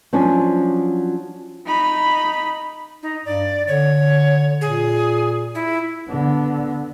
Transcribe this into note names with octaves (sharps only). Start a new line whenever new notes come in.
F3 F#3 C#4 D4
D#4 B5
D#4
G2 D5
D3 C#5
A#2 G#4
E4
D3 B3